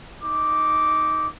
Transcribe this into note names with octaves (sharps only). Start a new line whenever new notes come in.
D#4 D6